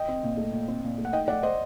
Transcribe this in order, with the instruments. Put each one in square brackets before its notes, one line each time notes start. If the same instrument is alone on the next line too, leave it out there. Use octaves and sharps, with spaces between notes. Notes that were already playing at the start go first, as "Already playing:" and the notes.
Already playing: [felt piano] D#5 G5
[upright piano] C4
A#2
A3
A#2
C4
A#2
A3
[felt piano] F#5
[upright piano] D#4 [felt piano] D#5 G5
[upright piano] A3 [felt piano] D5 F#5
[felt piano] C5 D#5